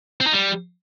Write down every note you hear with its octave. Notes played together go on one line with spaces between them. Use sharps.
C4
D#4
G3